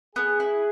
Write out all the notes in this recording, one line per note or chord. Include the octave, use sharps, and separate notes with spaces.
B3 G#4
E4